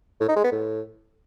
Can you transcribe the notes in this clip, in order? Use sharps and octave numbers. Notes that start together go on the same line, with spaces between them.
A2
D#4
G#3
B3
A2